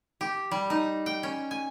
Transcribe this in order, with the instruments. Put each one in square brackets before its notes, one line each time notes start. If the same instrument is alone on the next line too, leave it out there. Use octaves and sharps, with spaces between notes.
[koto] G4
G3
D#4
G5
C#4
G#5